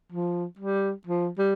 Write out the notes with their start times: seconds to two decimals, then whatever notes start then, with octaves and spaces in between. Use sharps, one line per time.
0.12 F3
0.59 G3
1.07 F3
1.38 G3